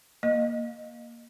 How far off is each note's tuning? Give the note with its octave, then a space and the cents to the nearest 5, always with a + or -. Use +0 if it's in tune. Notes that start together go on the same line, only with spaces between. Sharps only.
A#3 +0 D#5 -10